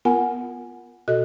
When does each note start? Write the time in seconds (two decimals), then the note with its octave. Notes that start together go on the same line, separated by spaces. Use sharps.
0.05 B3 F4 A#4 F#5 G#5
1.08 B2 F#4 A4 D#5 F#6